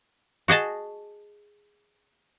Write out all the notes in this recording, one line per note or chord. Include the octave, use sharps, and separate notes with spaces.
F#4 G#4 D#5 A5